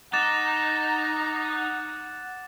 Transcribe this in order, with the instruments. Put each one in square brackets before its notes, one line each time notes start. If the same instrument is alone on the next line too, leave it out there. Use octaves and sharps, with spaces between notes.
[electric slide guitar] D#4 [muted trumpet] F#5 [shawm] A#5 [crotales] D6 A6 E7